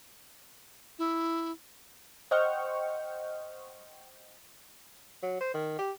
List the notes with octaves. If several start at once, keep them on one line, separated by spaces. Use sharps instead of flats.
E4
C5 D#5 F#5 G5 C#6 F6
F#3
C5
D#3
G4